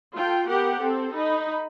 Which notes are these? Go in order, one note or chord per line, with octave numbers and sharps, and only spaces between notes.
F4 A4 G5
B3 G4 A#4 F#5
C4 A4
D#4 B5